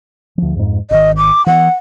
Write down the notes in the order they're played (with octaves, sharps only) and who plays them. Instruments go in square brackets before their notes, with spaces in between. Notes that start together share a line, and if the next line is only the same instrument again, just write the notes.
[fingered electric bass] D2 F3
F2 G#2
[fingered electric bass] G#1 D#3 [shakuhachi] D#5
[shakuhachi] D6
[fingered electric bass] E3 B3 [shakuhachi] F#5